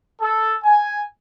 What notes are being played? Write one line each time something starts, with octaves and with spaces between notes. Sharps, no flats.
A4
G#5